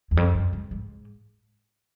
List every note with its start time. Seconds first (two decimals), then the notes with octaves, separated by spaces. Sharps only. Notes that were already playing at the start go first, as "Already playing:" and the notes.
0.11 E2
0.17 F2
0.35 F#2
0.53 G#2
0.71 G#2